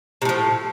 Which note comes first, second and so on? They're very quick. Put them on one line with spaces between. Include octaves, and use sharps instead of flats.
C3 A2 F3